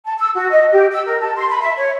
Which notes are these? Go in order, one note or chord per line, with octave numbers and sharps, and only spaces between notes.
A5
E6
F#4
D#5
G4
E6
A#4
A5
C6
B5
E5
C#5